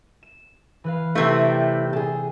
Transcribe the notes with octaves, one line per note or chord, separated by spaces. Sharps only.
E7
E3 B4 F5
C3 A3 E4
D5 G5
C3 G#4 A4 C6